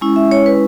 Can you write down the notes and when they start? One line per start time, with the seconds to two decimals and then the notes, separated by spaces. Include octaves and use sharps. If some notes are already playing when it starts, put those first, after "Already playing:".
0.01 G#3 C#4 E4
0.16 E5
0.31 C#5
0.46 B4